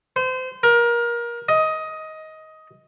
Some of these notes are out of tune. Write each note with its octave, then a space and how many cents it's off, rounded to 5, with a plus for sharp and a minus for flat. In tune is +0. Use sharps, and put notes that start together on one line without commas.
C5 -30
A#4 +25
D#5 +15